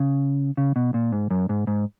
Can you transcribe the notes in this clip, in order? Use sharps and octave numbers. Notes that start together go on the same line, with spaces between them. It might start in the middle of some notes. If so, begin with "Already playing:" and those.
Already playing: C#3
C#3
B2
A#2
G#2
F#2
G#2
G#2